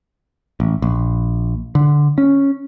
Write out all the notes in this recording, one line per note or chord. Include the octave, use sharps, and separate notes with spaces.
A1
A#1
D3
C#4